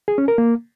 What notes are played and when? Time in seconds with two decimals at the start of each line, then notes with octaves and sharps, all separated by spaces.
0.08 G#4
0.18 C#4
0.28 A#4
0.38 A#3